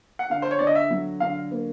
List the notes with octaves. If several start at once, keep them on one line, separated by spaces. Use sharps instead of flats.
F#5
D3 F5
C5
C#5
D3 D5
D#5
E5
F#3
D3 F5
A#3